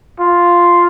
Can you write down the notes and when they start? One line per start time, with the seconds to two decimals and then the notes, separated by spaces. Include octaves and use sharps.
0.20 F4